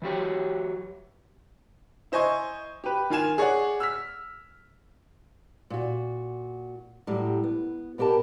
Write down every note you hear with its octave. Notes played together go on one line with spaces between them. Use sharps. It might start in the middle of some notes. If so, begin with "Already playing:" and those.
E3 F#3 G4 C#5
E4 C5 D#5 G#5 C#6
G4 B4
D#3 F4 G#5 E7
G#4 C#5 D5 F#5
E6 F6 B6
A#2 F#4
A2 F#3 G3 G4
B3
B2 B3 G4 A#4 A5